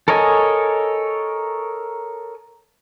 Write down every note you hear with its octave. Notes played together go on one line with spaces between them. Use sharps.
A4 A#4 C#5 D#5 G#5